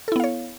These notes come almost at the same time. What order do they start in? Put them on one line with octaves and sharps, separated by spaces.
A4 E4 B3 F5 C#5